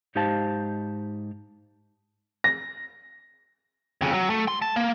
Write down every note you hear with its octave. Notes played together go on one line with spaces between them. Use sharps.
G#2 D#4 G4 C5 F5 A5
A#6
F2 C#3
F#3
A3
C6
A5
A#3